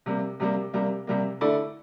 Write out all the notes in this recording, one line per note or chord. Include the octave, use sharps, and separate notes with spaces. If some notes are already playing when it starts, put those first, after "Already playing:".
C3 G3 A#3
C3 G3 A#3
C3 G3 A#3
C3 G3 A#3
D3 A3 E4 A4 D5